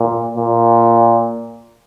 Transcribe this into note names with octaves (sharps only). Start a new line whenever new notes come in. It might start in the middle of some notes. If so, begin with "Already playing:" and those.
Already playing: A#2
A#2